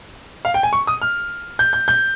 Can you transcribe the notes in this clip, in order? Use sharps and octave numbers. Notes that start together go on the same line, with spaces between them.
F5
G5
G#5
C#6
D#6
F6
G6
G6
G6